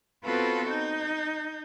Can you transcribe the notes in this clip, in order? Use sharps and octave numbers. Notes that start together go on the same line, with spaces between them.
B3 C4 F4 F#4 A4 B4
D#4 G6